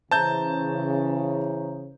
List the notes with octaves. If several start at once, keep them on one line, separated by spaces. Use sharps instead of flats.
C#3 E3 C5 E5 A5 A#5 G6